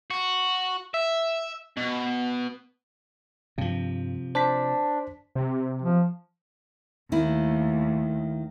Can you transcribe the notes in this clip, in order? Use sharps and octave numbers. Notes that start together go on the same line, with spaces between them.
F#4
E5
B2
G2 C3 F3
D4 C5 A5 B6
C3
F3
D#2 D#3 A3 E4